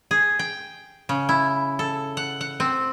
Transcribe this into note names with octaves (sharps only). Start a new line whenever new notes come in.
G#4
G5
C#3
E4
A4
F#5
F#5
C4